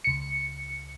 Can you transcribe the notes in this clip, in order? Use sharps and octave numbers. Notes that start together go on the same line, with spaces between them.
C#2 C#7